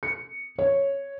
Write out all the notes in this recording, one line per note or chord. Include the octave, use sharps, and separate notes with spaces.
C#7
C#5